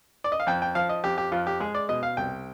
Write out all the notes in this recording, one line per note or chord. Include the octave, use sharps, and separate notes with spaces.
D5
D#5
F5
F2 G5
G5
F3 F5
D#5
F2 G4
G4
F2 F4
G4
G#3 G#4
D5
B2 D#5
F5
C2 G5